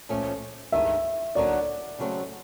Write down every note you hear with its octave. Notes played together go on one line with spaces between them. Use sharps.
A#2 F3 A3 C#4
G2 D#3 G#3 E5
D3 F#3 A#3 D#4 F#4 D5
C#3 F#3 A3 C4